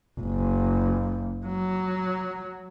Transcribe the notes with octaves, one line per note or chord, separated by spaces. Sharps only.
F#1
F#3